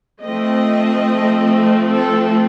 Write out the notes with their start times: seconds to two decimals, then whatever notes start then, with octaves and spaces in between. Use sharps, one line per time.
0.22 F3 A3 C4 D#5
1.93 A4